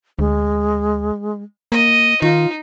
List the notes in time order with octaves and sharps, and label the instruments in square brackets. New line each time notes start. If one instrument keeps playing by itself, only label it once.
[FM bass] D2 [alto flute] G#3
[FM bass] A#3 [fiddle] D#5
[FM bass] D#3 [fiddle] D#4 [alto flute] F4